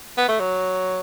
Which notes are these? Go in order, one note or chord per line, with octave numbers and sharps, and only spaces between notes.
B3
A3
F#3